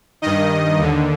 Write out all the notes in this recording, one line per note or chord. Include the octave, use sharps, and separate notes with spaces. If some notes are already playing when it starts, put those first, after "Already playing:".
G2 D#3 D#5
D#2 D3